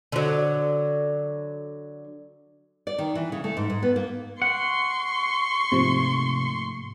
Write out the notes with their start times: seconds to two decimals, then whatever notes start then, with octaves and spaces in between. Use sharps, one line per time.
0.12 D3 F#3
2.87 D5
2.98 D#3
3.15 E3
3.32 C#3
3.44 A3
3.57 G#2
3.70 G#2
3.82 B3
3.96 A#3
4.42 F#5 C6 C#6
5.72 G#2 C3 F3 A3 A#3